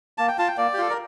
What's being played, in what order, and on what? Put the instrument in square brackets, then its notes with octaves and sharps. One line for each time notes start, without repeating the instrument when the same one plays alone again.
[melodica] A#3 A5
G5
F4 A5
G5
A#3 D5
G4
F4 A4
A#4